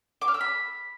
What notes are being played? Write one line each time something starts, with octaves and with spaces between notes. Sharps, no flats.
D6
F6
E6
B5